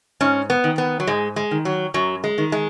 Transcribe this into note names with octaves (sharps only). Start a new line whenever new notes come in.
G#2 C#4
B3
D#3
B3
F#3
G#2 G#3
G#3
D#3
F#3
F#2 F#3
G#3
D#3
G#3